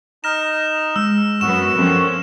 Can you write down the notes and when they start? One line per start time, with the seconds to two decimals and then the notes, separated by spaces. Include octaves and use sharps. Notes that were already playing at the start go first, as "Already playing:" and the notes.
0.24 D#4 A#5 F6 A#6 E7
0.96 G#3 E6
1.41 F#2 B3 F#4 E6 E7
1.78 F3 C4 C#4 A4 A#4